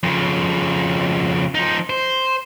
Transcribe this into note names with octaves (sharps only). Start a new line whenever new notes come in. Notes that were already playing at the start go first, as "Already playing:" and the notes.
F2 C#3
F3 D#4
C5